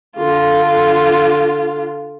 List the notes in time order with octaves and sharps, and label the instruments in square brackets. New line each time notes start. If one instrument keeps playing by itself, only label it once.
[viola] D3 F4